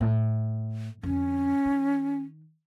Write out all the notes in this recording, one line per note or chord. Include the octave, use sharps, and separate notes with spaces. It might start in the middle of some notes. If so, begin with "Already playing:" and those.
A2
F2 D3 C#4
D#3